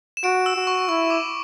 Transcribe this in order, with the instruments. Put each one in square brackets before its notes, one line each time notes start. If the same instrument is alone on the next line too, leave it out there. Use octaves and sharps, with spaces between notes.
[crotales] E7
[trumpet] F#4 [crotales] D7
[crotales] E6
[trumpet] F#4
[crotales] C#6
[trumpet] E4 [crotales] C#6
[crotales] D6